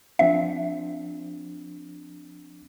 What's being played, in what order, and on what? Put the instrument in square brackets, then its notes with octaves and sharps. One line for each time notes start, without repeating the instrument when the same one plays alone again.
[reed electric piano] F3 C4 D4 [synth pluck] E5